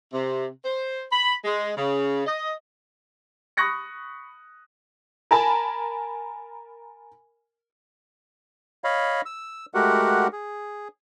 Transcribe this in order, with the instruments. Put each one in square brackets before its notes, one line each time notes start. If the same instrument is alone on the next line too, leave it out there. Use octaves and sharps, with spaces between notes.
[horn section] C3
C5
B5
G#3
C#3
D#5
[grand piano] B5 C#6 D#6 F#6 A#6 C#7
[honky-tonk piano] A#4 G#5 A5 B5
[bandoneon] C#5 D#5 F5 B5
E6
G#3 A3 F#4 G4 A#4 F#5
G#4